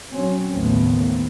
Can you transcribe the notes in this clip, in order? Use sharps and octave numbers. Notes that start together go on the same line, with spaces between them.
F#3 C4 C#4
A1 D#2 C#3 A3 B3 C4